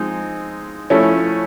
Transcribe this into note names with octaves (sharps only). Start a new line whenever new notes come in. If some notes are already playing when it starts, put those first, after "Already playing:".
Already playing: F3 G#3 C4 D#4
F3 A3 C#4 E4